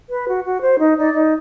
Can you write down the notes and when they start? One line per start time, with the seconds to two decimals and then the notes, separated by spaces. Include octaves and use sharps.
0.11 B4
0.28 F#4
0.45 F#4
0.62 C5
0.79 D#4
0.97 D#4 D5
1.14 D#4